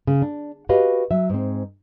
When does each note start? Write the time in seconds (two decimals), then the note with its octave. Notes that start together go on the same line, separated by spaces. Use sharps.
0.07 C#3
0.22 D4
0.69 F#4 G4 B4 D#5 F5
1.11 F#3 E5
1.30 G#2 C4